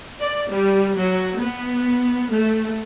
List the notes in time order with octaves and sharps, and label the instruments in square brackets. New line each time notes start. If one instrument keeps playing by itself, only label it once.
[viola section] D5
G3
F#3
B3
A3